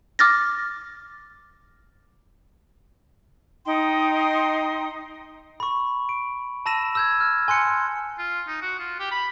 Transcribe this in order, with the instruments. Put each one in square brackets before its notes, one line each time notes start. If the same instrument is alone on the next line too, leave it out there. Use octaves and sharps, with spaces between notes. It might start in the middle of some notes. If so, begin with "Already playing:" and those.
[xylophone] D6 F6 A6 A#6
[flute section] D#4 G5 C6 D#6
[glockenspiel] B5 C#6
D7
A5 B5 E6 A#6 D#7 E7
E6 G6 G#6
F6
G#5 C6 F#6 C#7
[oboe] F4
D#4
F#4
F4
G4
B5